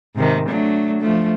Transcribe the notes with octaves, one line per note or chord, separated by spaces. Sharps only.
G#2 C3 D#3
F#3 A3 D4
F3 A3